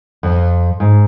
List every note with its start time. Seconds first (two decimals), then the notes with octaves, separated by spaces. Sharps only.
0.23 F2
0.80 G#2